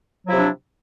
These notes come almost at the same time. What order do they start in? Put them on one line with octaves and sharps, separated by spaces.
F#3 F3 E4 C3 D4